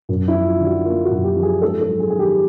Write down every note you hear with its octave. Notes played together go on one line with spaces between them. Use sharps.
F#2
E4
F3
F4
D3
F#4
A#3 F4
F#4
F#2
G4
F3
G#4
G#2 A4
A4
F#3
G#4
D#3 G#4
G4